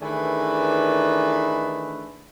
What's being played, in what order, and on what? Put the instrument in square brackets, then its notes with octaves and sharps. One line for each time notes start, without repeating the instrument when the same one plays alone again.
[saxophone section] D#3 E3 A3 D4 G#4 B4